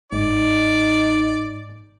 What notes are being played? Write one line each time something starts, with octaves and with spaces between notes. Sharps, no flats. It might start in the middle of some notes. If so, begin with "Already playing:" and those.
G1 G#2 D#4 D5